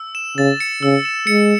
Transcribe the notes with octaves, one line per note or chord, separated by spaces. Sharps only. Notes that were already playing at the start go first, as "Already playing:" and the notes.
Already playing: E6
E7
C#3 A6
C#7
C#3 E6
E7
G#3 C#7